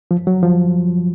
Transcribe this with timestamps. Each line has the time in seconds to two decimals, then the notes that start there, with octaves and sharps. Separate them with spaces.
0.11 F3
0.27 F#3
0.43 F3